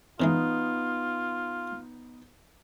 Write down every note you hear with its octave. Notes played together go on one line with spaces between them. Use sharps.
C#3 E3 G#3 B3 D#4 F4